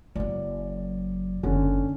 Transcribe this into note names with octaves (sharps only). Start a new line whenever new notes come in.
F#1 F#3 D5
F#1 D3 C#4